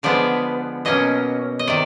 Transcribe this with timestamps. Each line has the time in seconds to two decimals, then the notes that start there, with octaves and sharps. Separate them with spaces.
0.03 D3 F3 G#3 B3 D5
0.85 B2 F#3 A#3 C#4 D#5
1.59 D#5
1.67 C3 D#3 D5